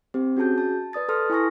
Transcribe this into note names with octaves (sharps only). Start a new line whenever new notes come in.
C4 G4 C5
C#4 F#4 G#4 A5 G6
A5
B4 D5 D#6 A6
A4 B4 A5 C6 D#6 F6
E4 G#5 C#6 A#6